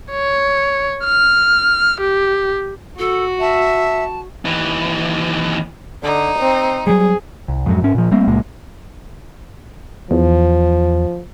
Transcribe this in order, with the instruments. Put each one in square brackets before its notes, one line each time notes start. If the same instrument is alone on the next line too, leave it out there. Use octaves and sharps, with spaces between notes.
[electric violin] C#5
F6
G4
[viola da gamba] F#4 [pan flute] A4
[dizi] E5 [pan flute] A5
[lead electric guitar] D#2 E3
[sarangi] D3 [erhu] D#4
[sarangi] C4
[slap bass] F#3 G3 [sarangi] G#4
[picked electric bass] C2
F2 G#2 F#3
G#2 C#4
A#2 F3
G3 A3 A#3 C4
C#2 A#2 G#3 A#3
[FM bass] E2 [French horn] F3